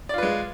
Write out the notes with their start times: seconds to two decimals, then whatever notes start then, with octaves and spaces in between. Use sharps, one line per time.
0.09 D5
0.14 F4
0.18 B4
0.23 G#3